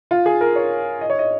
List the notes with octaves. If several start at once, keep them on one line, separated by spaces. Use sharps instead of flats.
F4
G#4
A#4
C#5
D#5
C#5
D#5